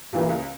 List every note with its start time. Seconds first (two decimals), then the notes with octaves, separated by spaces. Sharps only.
0.13 G2 A#2 E3 A#3
0.28 C#2 C#3